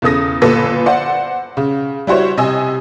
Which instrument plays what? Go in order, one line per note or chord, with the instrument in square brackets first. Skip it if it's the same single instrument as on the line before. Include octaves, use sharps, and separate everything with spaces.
[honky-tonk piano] E2 C#3 A4 D#6 A#6
G1 A#2 A4 B4 E6 A#6
C5 D5 F#5 C6
C#3
G3 E4 F#4 C5 C#5
C3 D#5 G#5 E6